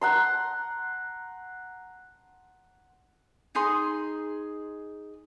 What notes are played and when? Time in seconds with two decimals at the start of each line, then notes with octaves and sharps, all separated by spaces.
0.01 F#5 A#5 C6
3.55 D#4 G#4 C6